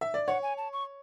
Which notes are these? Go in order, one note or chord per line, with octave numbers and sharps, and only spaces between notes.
E5
D5
C#5 F#5
G#5
A5
C#6